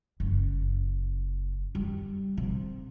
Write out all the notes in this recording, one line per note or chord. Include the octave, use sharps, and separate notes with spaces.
F#1
G3
C3